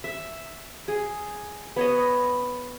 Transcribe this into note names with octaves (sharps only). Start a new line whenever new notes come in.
E5
G#4
B3 C#5 D#5